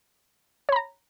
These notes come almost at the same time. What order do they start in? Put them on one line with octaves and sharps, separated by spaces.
C#5 B5 A#5